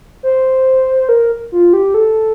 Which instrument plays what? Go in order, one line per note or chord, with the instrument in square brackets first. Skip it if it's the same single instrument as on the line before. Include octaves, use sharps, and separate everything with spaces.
[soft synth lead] C5
A#4
F4
G4
A4